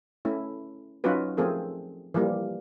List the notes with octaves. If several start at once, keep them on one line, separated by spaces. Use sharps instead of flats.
A3 C#4 E4
F#3 C#4 D#4 F4 F#4 B4
F3 A3 C4 G#4 A#4
E3 F3 G3 A#3